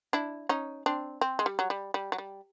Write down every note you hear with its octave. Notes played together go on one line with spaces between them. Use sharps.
D4 E4
C#4 D#4
C4 D4
C4
G#3
G3
F#3
G3
G3
F#3
G3